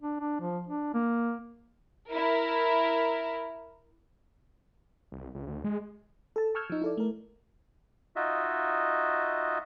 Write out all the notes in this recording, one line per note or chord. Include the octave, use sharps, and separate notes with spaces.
D4
D4
F3
D4
A#3
E4 A#4
C2
C#2
D2
G#3
A4 A5
A5 C#6 E6 F6 G6 G#6
F3 D#4
E4 A4 D5
A3 A#4
D#4 F4 F#4 D#5 E5